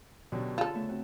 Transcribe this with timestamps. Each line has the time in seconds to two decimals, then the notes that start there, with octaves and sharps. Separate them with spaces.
0.32 B2 D3 F#3 C#4 G4 G#4
0.58 F4 G#4 A4 A5 E7
0.74 C#3 A3 B3
0.89 C4 F#4